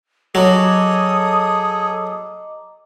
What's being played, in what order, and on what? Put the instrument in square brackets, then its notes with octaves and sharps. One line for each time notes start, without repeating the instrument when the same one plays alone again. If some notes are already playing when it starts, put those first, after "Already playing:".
[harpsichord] F#3 [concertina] G#4 A4 [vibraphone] D#5 A#5 D6 [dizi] D#6